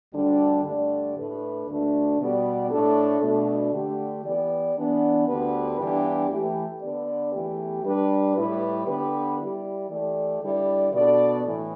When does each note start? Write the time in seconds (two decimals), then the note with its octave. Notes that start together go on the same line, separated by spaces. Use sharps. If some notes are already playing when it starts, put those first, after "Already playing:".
0.14 D2 D3 G3 D4
0.64 G2 D3 A3 G4 D5
1.16 A2 A3 D4 B4
1.67 D2 D3 A3 D4 A4
2.18 B2 G3 B3 G4 D5
2.70 A2 A3 D4 A4
3.21 B2 A3 D4
3.73 D3 A3 G4
4.24 E3 B3 G4 D5
4.76 E3 B3 D4
5.27 D2 D3 B3 G4 B4
5.78 G2 E3 B3 D4 G4
6.30 E3 A3 G4
6.81 D3 B3 D4 B4 D5
7.33 E2 E3 A3 G4
7.84 G3 D4 B4
8.35 A2 G3 E4 G4 B4
8.87 D3 B3 G4 B4
9.38 G3 E4 G4 D5
9.89 E3 A3 G4 D5
10.41 D3 G3 E4 B4 D5
10.92 B2 B3 D4 A4 D5
11.44 A2 E3